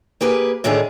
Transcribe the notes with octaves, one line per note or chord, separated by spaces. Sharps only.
A#3 G4 G#4 B4
A2 D3 D#3 A3 D4 G#4